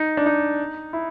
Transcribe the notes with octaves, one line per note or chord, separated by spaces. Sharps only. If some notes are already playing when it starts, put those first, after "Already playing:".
Already playing: D#4
D4
D#4
E4